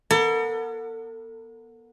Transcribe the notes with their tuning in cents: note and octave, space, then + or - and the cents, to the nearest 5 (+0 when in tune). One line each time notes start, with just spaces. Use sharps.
B3 -35 A4 +40